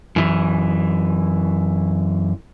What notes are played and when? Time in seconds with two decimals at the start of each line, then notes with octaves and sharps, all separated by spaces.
0.16 F#2 E3